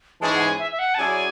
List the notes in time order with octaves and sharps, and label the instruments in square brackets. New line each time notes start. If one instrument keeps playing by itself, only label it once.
[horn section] G#2 E3 G#3 C#4 G#4 [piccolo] A5
[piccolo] F#5
G#5
E5
E5
F#5
A5
[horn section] F#3 C#4 E4 G#4 D5 [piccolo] G#5